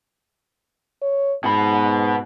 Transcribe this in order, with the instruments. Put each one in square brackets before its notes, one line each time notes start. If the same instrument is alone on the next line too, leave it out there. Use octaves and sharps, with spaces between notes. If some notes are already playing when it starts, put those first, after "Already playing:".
[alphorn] C#5
[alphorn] G#2 [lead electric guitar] B2 B5